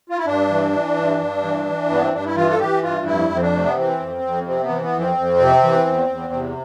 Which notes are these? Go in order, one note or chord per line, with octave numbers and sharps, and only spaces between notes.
F4
E4
G2 D4
E3
E3
G2
G2
E3
E3
G2 B3
C4
G2 D4
E4
E3 F4
A4
E3 G4
G2 F4
F2 E4
F2
C4
D4
C3 A3
B3
E3 C4
F2
F2
C3 C4
B3
E3
B3
F2
C4
F2
C3
E3
E2
E2
C3